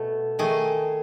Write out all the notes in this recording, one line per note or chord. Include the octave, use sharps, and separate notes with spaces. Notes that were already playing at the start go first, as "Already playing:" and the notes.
Already playing: B2 A3
D#3 A3 G#4